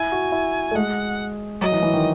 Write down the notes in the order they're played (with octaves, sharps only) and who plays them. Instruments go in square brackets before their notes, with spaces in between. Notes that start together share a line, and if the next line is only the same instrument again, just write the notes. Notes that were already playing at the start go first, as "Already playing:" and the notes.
Already playing: [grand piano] E4 [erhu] G#5
[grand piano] F#4
E4
A3
[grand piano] G#3 [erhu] F#5
[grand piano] F#3 [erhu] D#5
[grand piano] E3
E3
D#3